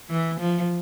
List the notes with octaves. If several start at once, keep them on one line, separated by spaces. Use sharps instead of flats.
E3
F3